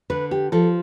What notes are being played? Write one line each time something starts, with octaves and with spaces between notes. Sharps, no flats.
D3 B4
G4
F3 A4